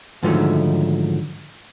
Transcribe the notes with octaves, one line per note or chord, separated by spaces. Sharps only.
G#2 D3 D#3 F3 F#3 A3